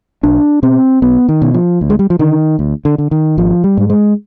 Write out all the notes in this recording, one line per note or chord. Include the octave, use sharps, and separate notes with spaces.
B1 D4
B2 C4
B1 B3
D#3
B2
F3
D2
G#3
G3
F3
D3 D#3
D2
D3
D3
D#3
G#1 F3
G3
G#2
G#3